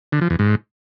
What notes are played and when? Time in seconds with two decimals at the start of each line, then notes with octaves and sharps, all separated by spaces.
0.12 D3
0.21 F3
0.30 E2
0.39 G#2